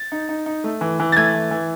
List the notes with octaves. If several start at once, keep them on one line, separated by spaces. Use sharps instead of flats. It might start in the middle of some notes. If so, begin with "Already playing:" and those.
Already playing: A6
D#4
D#4
D#4
A3
E3
E3
A6
A3 G#6
E3
E3